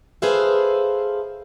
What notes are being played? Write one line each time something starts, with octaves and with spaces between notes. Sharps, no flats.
G#4 A4 B4 C5 E5 F5